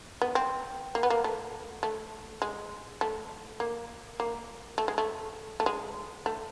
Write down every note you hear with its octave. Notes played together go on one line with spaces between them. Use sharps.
B3
C4
A#3
B3
A#3
A3
A3
G#3
A3
A#3
A#3
A3
G#3
A3
A3
G#3
A3